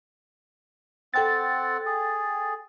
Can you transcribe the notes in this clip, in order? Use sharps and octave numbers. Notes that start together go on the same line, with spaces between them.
C4 A4 F#5 G5 A6
G#4